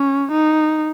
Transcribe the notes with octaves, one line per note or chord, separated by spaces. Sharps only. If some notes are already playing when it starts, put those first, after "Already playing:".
Already playing: C#4
D#4